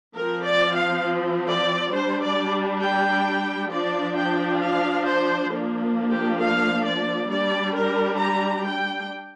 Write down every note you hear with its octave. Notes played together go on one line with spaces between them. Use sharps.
F3 C4 A#4
D5
F5
D5
G3 D4 C5
D5
G5
F3 D4 D5
G5
F5
C5
F3 A#3 D4
G4
F5
D5
G3 D4 D5
A#4
A#5
G5